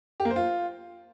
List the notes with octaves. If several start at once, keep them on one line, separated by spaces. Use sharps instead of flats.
G4
A#3
C5
F4